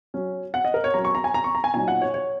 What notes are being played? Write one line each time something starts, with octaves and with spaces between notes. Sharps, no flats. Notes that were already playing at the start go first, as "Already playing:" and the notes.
F#3 C#4
F#5
D#5
A#4
C#5
F#3 C#4 A#5
C#6
A#5
G#5
A#5
C#6
A#5
G#5
A#2 F#3 D#4 G#5
F#5
C#5
C#5